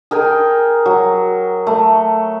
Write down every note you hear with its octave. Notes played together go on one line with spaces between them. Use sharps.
G#4 A#4 G5 G#5
F#3
A3